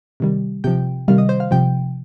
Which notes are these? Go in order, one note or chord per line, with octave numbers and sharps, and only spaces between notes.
C3 D#3 G3
C3 F3 G5
C3 D#3 G3 F5
D#5
C5
F5
C3 F3 G5